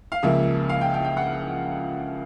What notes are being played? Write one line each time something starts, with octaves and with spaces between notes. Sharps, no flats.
F5
C#2 C#3 F3 A#3 E5
F5
G5
G5
G5
F#5